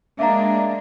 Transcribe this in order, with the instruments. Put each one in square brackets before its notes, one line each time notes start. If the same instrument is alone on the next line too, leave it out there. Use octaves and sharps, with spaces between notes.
[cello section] G#3 A#3 D4 [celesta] E5 F5 A#5